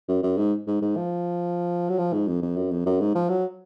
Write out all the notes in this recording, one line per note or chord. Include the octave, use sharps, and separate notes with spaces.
F#2
F#2
G#2
G#2
G#2
F3
F#3
F3
G#2
F2
F2
F#2
F2
F#2
G#2
F3
F#3